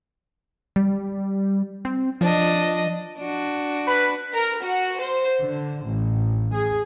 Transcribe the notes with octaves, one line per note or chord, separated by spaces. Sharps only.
G3
C4
F3 D4 D#5
D4 F#4
B4 B5
A#4
F#4
C5
D3
A1
G#4